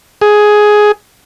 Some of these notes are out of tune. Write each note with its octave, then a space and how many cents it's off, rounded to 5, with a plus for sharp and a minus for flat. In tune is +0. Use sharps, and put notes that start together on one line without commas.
G#4 +10